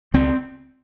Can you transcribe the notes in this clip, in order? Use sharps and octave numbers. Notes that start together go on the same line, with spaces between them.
C#2 C4